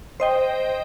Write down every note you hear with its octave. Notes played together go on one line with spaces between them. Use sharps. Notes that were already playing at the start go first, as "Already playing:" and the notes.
C5 D#5 G5